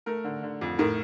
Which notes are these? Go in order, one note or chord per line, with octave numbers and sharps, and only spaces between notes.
A3 A#4
D3
D3
F2
A2 A#4